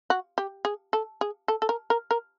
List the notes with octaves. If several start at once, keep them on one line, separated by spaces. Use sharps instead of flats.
F#4
G4
G#4
A4
G#4
A4
A4
A#4
A#4
A#4